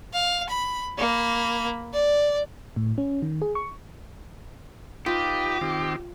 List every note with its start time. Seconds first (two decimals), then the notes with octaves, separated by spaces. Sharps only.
0.13 F5
0.49 B5
0.98 A#3 B5
1.94 D5
2.76 A2
2.98 C#4
3.22 D#3
3.42 G#4
3.55 C#6
5.06 D#4 F4 G4 B4
5.61 D#3 C4